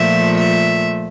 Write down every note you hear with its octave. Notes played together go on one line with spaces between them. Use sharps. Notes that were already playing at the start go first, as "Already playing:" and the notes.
Already playing: A#2 F3 A3 E5
E5